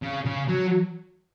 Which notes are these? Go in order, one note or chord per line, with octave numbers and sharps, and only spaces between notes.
C#3
C#3
F#3